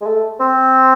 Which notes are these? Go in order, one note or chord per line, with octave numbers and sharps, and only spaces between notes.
G#3
A3
C4